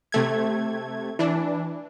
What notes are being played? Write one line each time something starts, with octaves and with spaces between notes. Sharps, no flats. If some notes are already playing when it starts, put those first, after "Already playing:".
C3 A3 G#6
E3 D4